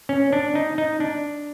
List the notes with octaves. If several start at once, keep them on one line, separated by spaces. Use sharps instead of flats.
C#4
D4
D#4
D#4
D4